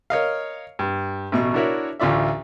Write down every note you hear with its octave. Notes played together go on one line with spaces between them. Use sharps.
A#4 C#5 D#5 F5
G2
A1 B2 C#6
D4 E4 F#4 A#4 C#5 E5
A1 D2 F4 D5 E5